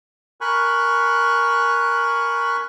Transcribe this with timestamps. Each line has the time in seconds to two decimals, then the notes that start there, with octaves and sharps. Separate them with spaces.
0.41 A#4 G#5 B5 C#6 F#6